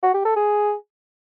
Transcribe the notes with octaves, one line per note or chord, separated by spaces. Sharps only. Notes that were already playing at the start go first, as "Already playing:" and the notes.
F#4
G4
A4
G#4